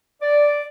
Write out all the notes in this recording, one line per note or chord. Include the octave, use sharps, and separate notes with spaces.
D5